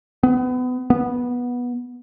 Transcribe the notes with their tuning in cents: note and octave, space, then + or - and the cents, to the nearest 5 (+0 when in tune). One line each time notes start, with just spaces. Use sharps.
B3 +30
B3 -15